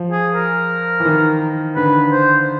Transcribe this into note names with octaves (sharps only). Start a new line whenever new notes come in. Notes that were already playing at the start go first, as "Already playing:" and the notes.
Already playing: F3
G#4
A#4
E3
D#3
D3 B4
C5